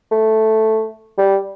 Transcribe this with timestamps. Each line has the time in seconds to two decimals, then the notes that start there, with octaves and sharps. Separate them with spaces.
0.12 A3
1.18 G3